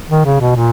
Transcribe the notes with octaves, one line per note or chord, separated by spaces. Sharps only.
D#3
C#3
B2
A#2